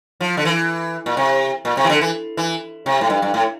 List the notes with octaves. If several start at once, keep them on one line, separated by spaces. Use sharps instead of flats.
F3
D3
E3
A#2
C3
A#2
C3
E3
D3
E3
E3
C3
A2
G2
G2
A2